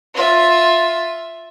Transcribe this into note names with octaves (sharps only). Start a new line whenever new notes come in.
F4 E5